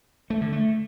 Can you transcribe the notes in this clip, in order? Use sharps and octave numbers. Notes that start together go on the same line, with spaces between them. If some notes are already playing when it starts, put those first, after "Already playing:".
A3
D3
A3